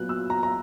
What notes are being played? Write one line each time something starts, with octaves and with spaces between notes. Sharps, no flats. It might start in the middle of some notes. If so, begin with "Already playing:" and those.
Already playing: A#2 F#3 B3 F#6
E6
A#5
A#5